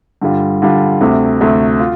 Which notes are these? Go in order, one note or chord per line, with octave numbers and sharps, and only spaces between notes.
G2 D3 G3 F4
G2 D3 G3 F4
D2 C3 A3
D2 C3 A3
F4